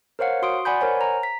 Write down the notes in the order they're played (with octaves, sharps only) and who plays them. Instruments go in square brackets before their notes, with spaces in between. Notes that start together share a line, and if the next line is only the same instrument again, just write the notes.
[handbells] A#4 C5 C#5 F5 F#5
F#4 C6 D#6 D7
D5 F#5 G#5 B5 G6
A#4 C5 C#5 F#5 G#5
A#5
B6